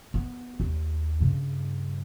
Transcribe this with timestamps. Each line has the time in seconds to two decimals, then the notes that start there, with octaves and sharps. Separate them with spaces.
0.14 B3
0.60 D#2
1.21 G2 C#3